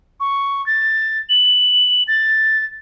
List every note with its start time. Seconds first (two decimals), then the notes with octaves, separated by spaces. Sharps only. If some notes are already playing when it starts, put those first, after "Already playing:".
0.20 C#6
0.66 A6
1.30 F#7
2.08 A6